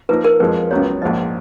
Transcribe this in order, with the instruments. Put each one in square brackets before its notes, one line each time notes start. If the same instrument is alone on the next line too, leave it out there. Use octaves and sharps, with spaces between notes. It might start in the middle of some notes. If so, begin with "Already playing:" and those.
[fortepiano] F3 A#3 D#4 A#4 [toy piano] B4
[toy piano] A#4
[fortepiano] F2 F3 G#3 [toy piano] B4
[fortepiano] C#2 C#3 F#3 B3 [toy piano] C#5
[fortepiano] A#1 G#2 F3 [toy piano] D#5